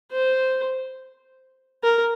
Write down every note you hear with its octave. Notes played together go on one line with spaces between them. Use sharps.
C5
A#4